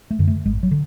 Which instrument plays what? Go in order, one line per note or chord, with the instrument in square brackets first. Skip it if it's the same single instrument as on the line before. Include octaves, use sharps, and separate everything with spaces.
[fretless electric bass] A3
F#2 D3
A3
G#1 G#3
F#3
D3